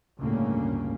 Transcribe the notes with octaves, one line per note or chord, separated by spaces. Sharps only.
G1 D2 A2 C#3 A#3 C#4